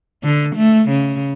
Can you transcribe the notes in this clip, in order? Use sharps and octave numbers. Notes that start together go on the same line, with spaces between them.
D3
A3
C#3